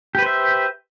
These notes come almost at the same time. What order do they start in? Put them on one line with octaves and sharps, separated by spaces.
G4 B4 C5 E5